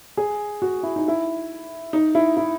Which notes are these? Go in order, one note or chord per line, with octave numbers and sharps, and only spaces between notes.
G#4
F#4
E4
D#4
E4
D#4
E4
E4